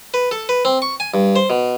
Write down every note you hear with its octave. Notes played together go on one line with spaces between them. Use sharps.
B4
A4
B4
C4
C#6
G#5
G2
C5
B2